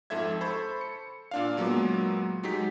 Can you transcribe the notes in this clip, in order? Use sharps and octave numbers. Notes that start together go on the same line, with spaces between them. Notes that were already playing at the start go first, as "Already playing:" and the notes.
F2 G#2 A4 E5 G#6
A4 C5 B5 C#6 G#6
C#7
A#2 D4 F5
A#2 F#3 G#3 A#3 B3
F#3 G#3 D#4 G4 B6